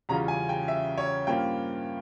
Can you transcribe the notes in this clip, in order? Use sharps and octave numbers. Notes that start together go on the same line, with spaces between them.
E2 C#3 G3 C#4 F4 A#5
G#5
G5
E5
C#5
G2 F3 A#3 C#4 F4 G5